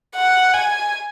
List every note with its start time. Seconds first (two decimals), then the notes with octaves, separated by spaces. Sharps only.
0.16 F#5
0.54 G#5